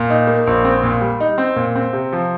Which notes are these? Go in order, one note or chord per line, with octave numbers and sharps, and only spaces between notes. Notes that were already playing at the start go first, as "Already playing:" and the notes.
Already playing: A#2
D#4
A#3
A#1
C4
A#2
G3
D#4
C4
A#2
C4
C3
F3